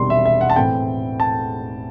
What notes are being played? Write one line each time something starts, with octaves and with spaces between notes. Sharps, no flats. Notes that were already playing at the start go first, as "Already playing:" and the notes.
Already playing: E1 E2 C3 D#3 G3 C6
E5
E5
F#5
A5
A2 E3 A3 C4 G5
A5